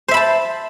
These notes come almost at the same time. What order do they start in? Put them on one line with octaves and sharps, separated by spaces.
C5 E5 B5 A5